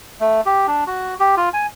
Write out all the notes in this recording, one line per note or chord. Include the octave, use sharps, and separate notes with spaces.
A3
G4
D4
F#4
G4
F4
G#5